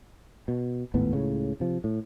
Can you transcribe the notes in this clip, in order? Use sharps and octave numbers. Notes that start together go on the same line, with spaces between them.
B2
G#1 D#2 A2 B3
C#2 A2 C#3
C3 F3
A2